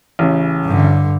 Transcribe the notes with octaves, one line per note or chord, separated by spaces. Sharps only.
A1 C#3
G2 D3